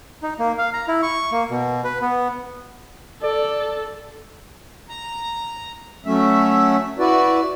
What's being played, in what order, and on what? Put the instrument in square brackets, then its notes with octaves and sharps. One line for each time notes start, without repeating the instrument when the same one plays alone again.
[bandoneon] D#4
A#3
F5
A#5
E4
C#6
A#3
B2
B4
B3
[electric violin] A4 [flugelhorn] D5
[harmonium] A#5
F#3 A3 C#4 E5
E4 F#4 B4 D5